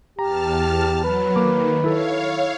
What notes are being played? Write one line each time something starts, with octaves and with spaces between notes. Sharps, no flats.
E2 G4 A5 A#5 F6
F#3 B4
D#3 A#3 D6
E4 A4 C#5 F5